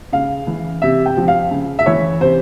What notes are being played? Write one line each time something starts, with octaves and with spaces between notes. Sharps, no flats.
C#3 F5
E3
C3 E5
G5
F3
F5
C#3
E5
E3 C#5
C3 C5